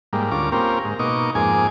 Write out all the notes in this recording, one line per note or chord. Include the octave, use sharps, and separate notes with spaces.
G#2 G3 A#3
D2 C#4 F4 A#4 D6
A#3 C4 C#4 F4 G4 A#4
G#2
B2 A#3 D#4 D#5 C#6 D6
F2 G#2 A#3 G#4 G#5 D6